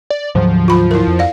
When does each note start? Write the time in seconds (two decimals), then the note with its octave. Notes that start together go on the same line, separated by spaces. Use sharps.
0.10 D5
0.35 D2 G#2 F3 F#3
0.68 F4 B5
0.91 E4 A#4
1.07 F2
1.19 D5 F5